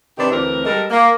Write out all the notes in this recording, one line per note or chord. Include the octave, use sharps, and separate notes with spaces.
C3 D#3 D4 G4 B4
D2 E3 A3 C4 A#4
G3 G#3 A4 A#4
A#3